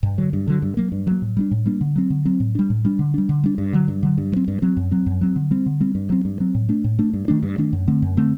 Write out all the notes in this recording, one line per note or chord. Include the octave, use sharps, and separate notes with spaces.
G2
D3 F#3
G2
D3 F#3
G2
F#3 A#3
G2
F#3 A#3
A2
G3 A#3 D4
A2
G3 A#3 D4
D3
F#3 C4
D3
F#3 C4
A2
G3 D4
A2
G3 D4
D3
G3 D4
D3
G3 D4
G2
D3 F#3
G2
D3 F#3
G2
F#3 C4
G2
F#3 C4
F#2
F#3 C4
F#2
F#3 C4
D3
G3 C4
D3
G3 C4
G2
F#3 C4
G2
F#3 C4
A2
A3 D4
A2
A3 D4
G2
D#3 A3 D4
G2
D#3 A3 D4
F#2
D3 A3 C4
F#2
D3 A3 C4